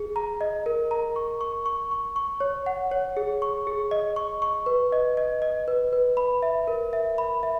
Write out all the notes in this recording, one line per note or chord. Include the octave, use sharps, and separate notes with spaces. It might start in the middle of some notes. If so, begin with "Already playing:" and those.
Already playing: G#4
A#5
D#5
A#4
A#5
C#6
C#6
C#6
C#6
C#6
C#5
F#5
C#5
G#4
C#6
G#4
D#5
C#6
C#6
B4
D#5
D#5
D#5
B4
B4
B5
E5
A#4
E5
B5
E5